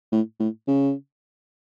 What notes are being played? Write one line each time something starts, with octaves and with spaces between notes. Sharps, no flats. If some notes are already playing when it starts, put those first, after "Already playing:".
A2
A2
C#3